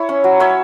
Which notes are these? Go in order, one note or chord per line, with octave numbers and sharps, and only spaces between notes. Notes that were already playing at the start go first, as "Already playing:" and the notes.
Already playing: E4 C#5
C#4
F#3
C#4 C#5 E5